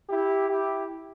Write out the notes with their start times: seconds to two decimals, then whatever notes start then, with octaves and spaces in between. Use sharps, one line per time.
0.10 E4 G4
0.49 E4 G4